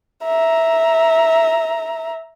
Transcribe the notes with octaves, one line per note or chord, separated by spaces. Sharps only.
E5 A#5